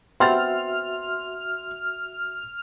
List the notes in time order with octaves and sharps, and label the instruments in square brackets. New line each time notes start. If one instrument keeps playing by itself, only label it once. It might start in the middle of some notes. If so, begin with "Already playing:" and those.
[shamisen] B3 C4 [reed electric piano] F#4 E5 [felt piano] C6 A6 [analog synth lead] F6